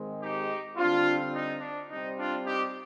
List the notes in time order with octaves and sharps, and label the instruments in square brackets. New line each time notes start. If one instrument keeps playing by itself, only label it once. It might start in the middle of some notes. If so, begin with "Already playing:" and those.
Already playing: [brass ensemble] G#2 D#3 G#3 C4
D#4 G4
D3 G3 C4 D4 F4
D#4
D4
C3 G3 C4 D#4
D4 F4
D#4 G4